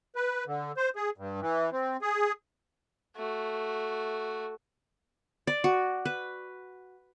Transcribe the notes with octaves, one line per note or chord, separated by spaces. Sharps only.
B4
D3
C5
G#4
G2
E3
C4
G#4
A3 F#4
D5
F#4
B4